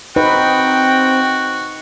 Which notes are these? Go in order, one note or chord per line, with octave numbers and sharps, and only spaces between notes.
C4 D#4 F#4 B4 G5